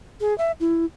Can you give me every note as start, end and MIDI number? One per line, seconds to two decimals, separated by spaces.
0.20 0.36 68
0.38 0.52 76
0.60 0.85 64